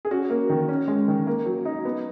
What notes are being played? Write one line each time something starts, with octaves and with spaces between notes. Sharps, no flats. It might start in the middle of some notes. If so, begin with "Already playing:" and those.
G#4
C#4 F#4
A#3
D#3
C#4
G#3
D#3
A#3
F#3
D#4
B3